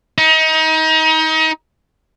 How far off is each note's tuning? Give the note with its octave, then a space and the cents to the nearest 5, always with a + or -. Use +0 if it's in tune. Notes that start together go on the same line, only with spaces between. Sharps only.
D#4 +30